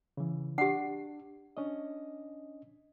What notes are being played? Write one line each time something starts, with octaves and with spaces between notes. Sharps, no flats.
C#3 E3
D4 G4 F#5
C#4 D4 D#5